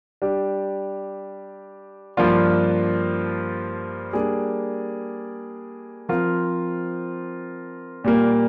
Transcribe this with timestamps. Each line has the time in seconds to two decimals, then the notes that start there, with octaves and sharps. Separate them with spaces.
0.22 G3 D4 G4
2.17 G2 F3 A#3 D4 F4
4.13 G3 A#3 D4 G#4 D5
6.09 F3 C4 F4 A#4
8.04 A#2 G3 A#3